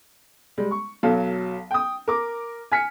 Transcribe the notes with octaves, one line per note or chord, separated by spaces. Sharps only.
G3 G#3
C#6
B1 F#3 A4 F5
G5 D#6
A#4 D6
G#5 F6 B6 C#7